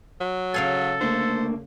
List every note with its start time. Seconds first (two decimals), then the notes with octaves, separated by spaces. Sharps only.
0.21 F#3
0.54 C#3 A4 F5 G#5
1.01 D3 A3 A#3 C5